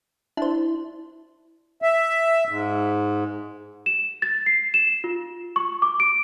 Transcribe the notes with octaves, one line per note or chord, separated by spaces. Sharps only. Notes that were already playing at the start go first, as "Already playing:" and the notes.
D4 E4 C5
E5
G#2
E7
A6
C7
E7
F4
C#6
D6
D7